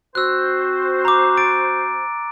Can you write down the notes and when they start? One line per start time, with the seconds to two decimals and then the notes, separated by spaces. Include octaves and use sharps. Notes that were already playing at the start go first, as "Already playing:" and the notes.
0.15 C4 F#4 C5 E6 F#6
1.05 A#5 D6
1.37 D6 A6 D7